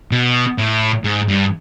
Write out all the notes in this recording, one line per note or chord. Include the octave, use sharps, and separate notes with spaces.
B2
A2
G#2
G2